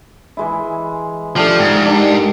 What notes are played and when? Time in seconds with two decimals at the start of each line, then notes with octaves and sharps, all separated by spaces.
0.37 E3 G#3 E4
1.36 F3 A3 D4 G4
1.59 G#2 G5
1.86 D4 G4 A#4